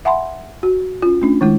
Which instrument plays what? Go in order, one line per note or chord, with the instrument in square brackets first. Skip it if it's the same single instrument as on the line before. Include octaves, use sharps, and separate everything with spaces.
[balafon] E5 F#5 G#5 B5 C6
F#4
C#4 F4
A3 C#4 D4
D#3 G#3 E4